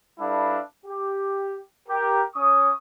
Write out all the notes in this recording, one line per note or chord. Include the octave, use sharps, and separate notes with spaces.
G3 D4 E4 A4 B4 F5
G4
G4 A#4
C#4 C#5 C#6 D#6